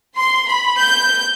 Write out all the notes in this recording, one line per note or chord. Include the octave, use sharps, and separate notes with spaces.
C6
B5
G6